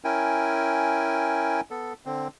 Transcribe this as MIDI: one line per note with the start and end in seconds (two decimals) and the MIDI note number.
0.04 1.61 61
0.04 1.61 64
0.04 1.61 70
0.04 1.61 79
0.04 1.61 80
1.71 1.93 59
1.71 1.93 69
2.06 2.28 50
2.06 2.28 60